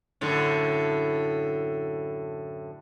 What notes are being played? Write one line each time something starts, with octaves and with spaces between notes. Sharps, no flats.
F#2 A2 D3